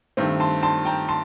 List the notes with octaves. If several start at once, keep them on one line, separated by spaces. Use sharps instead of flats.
G2 D#3 A3 C4
A5 C6
A5 C6
G5 A#5
A5 C6